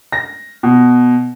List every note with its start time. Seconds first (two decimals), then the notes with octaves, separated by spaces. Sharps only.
0.12 A#6
0.63 B2